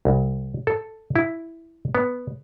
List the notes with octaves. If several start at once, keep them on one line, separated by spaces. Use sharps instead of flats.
C2
A4
E4
B3